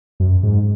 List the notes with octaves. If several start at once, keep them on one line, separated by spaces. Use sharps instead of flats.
F#2
G#2